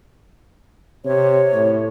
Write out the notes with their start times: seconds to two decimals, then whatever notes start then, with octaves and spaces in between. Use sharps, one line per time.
1.05 C3 C#5
1.53 A2